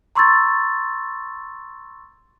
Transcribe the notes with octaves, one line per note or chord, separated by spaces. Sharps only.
A#5 C6 C#6 E6 G#6 A6